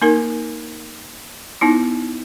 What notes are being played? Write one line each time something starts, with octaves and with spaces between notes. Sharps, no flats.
A#3 D#4 A#4
B3 D#4 E4